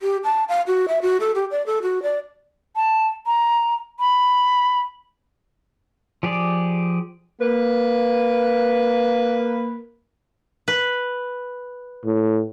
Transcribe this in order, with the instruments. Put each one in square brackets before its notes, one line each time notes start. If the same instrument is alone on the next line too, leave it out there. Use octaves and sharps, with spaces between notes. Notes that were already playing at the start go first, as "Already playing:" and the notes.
[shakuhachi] G4
A5
F5
F#4
E5
F#4
A4
G4
D5
A4
F#4
D5
[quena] A5
A#5
B5
[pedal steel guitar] F3 G4 G#4 D5
[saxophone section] A#3 B4
[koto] B4
[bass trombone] A2